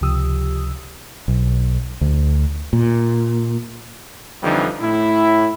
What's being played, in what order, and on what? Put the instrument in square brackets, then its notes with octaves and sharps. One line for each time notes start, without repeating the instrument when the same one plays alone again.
[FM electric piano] C#2 C3 F3 G4 D#6 E6
[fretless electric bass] B1
D2
A#2
[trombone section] F2 D3 E3 F3 G3 D#4
A2 E4